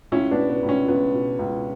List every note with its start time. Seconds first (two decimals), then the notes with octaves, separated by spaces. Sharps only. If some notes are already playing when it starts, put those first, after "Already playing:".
0.12 C#2 C#4 E4
0.31 B3 D4
0.38 B2
0.50 B3
0.63 C#2
0.69 C#4
0.88 C#2 B3
1.13 B2
1.39 C#2